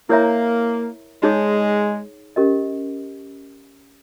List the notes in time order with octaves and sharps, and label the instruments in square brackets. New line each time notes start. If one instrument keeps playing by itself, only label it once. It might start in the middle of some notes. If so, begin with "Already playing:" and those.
[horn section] A#3 [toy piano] E4 A#4 C#5 E5 A#5
[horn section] G#3 [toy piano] D#4 G#4 C#5
[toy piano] C#4 G4 A#4 D#5